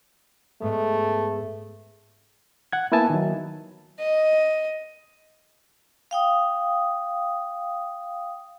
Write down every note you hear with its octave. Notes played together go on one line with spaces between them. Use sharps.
G#2 A3 B3
F#5 G#6
A#3 B3 E4 E5 G#5 A5
D#3 F#3
D#5
F5 G5 D#6